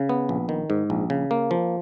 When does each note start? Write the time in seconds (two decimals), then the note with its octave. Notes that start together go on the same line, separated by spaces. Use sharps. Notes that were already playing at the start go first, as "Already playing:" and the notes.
Already playing: C#3
0.09 B3
0.29 A#1
0.49 D#3
0.70 G#2
0.90 A#1
1.10 C#3
1.31 A#3
1.51 F3